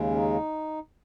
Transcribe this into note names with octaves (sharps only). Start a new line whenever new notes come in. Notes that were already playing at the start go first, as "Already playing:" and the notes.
Already playing: D#2 C#3 G#3
C#4
D#4